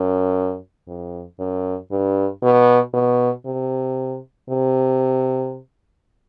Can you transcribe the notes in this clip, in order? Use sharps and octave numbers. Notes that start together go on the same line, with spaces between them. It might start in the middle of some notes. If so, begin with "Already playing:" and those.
Already playing: F#2
F2
F#2
G2
B2
B2
C3
C3